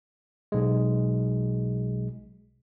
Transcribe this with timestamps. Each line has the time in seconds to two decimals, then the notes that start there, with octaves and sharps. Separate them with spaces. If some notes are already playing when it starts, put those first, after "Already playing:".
0.52 B1 G#3